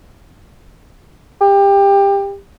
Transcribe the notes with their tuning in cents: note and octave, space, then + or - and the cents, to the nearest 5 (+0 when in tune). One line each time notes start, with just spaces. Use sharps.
G4 +20